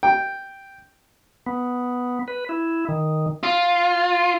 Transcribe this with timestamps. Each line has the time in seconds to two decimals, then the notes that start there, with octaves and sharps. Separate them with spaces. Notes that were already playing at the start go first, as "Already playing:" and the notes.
0.03 G5
1.46 B3
2.28 B4
2.49 E4
2.89 D#3
3.43 F4